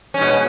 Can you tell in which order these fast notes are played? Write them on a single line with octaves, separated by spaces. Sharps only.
C#4 G#2 B2